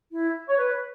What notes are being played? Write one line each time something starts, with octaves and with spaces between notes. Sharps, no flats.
E4
C#5
B4